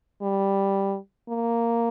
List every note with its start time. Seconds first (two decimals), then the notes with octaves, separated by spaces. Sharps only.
0.22 G3
1.29 A#3